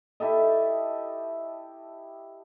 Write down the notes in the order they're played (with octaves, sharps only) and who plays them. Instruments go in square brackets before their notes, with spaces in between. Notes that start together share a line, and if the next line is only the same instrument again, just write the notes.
[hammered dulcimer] E4 G4 A4 D#5